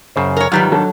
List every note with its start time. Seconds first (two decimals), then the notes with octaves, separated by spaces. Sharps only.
0.16 F#2 C#3 C5
0.37 A#4 C#5
0.52 G#2 D#3 F#3 G3 F4 G4 B4
0.72 F#3 D4 A4